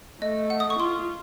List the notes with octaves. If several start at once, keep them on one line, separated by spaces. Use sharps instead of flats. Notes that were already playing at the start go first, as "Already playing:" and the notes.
A3 D#5
F#5
D#6
C#6
F4 C6